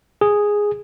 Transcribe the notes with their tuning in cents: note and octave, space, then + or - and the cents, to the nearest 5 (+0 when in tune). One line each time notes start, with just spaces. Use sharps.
G#4 -5